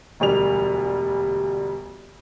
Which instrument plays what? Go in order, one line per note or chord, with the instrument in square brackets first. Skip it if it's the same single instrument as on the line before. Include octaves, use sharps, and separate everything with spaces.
[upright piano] E1 D2 G3 F7